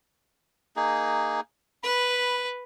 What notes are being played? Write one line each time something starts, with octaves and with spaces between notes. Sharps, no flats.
A#3 D#4 G#4
B4 B5